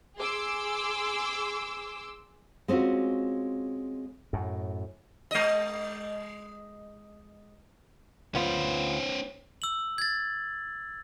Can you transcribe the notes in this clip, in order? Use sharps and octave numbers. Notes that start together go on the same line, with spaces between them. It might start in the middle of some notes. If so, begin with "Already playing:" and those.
G#4 C6 D6 E6
G#3 C4 C#4 F4 F#4
F#2 A2
G#3 D#5
D2 B3 C#4 F4 C5
E6 F#7
G#6 A6